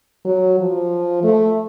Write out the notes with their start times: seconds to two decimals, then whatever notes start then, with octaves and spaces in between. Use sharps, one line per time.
0.25 F#3
0.60 F3
1.24 A3